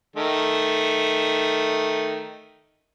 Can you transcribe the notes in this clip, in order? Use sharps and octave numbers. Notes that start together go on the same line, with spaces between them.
D#3 A3